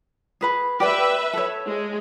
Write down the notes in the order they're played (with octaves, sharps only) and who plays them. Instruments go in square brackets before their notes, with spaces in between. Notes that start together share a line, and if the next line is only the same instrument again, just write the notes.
[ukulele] G#4 B4 B5
[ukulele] G4 D5 G5 [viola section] B4 E5
[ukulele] A4 C#5
[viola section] G#3